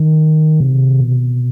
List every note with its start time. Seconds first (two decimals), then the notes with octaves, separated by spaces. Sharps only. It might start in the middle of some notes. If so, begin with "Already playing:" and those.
Already playing: D#3
0.60 C3
1.00 B2